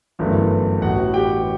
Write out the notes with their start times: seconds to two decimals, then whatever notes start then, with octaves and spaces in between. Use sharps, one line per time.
0.19 G1 F#2 E3 A3
0.82 A1 A2 E3 F#4 F#5
1.14 G4 G5